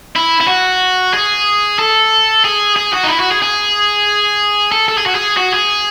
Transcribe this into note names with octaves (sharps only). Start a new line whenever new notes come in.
E4
E4
F#4
G#4
A4
G#4
G#4
F#4
D#4
E4
F#4
G#4
G#4
A4
A4
G#4
F#4
G#4
F#4
G#4